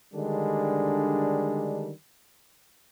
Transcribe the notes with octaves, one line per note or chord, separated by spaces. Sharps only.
D3 D#3 G3 G#3 D4